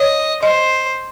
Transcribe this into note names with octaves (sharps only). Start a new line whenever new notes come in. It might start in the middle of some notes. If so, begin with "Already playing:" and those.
Already playing: C#5 D#5
C5 D#5